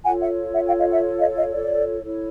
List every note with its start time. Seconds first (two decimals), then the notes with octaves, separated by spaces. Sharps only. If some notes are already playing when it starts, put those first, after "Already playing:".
0.05 F4 A4 C#5 F#5 G#5
0.21 E5 F#5
0.54 E5 F#5
0.67 F5 G5
0.79 D#5 F5
0.91 E5 F#5
1.19 D#5 F5
1.36 D#5 F5
1.53 D5
2.02 E4 A4 C#5